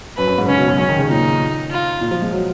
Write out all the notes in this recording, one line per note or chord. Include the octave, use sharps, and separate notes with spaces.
F#2 B4
F#2
G#2
C#3 C#4
B2
F#2
F#2 C#4
D#3
C#3
A#2 D#4
F4
A#2
F3
G#3
F#3